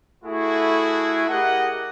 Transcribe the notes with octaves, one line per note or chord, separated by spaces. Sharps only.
A3 E4 F#4 G#4
G4 G#4 A#4 D#5 F#5